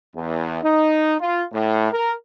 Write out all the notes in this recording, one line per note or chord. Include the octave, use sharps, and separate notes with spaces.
E2
D#4
F4
A2
A#4